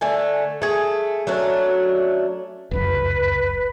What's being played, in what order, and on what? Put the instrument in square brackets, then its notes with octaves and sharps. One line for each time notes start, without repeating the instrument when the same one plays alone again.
[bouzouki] D3 A3 G#5
A3 G#4
F#3 A3 C#4 D4
[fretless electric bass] F1 C#2 F#2 [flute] B4